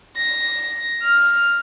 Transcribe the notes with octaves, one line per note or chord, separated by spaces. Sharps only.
A#6
F6